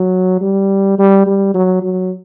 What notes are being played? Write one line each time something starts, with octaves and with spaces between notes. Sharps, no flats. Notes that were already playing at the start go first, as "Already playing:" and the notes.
Already playing: F#3
G3
G3
G3
F#3
F#3